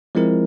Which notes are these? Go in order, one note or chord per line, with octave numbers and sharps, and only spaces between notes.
F3 G#3 C4 E4 A#4